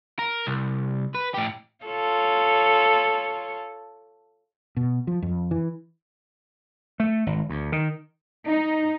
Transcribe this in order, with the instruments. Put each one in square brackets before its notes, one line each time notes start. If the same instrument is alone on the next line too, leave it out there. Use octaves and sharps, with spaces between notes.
[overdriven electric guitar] A#4
C2
B4
A2 G4
[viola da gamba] F4 A4 C#5
[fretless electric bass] B2
F3
F2
E3
[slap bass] A3
G#1
D2
D#3
[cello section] D#4